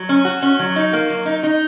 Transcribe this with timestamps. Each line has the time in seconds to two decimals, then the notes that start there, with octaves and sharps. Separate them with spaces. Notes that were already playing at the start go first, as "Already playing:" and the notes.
Already playing: F#3
0.09 C#4
0.25 F#4
0.43 C#4
0.59 F#3
0.76 D#4
0.93 A#3
1.10 F#3
1.26 D#4
1.43 D#4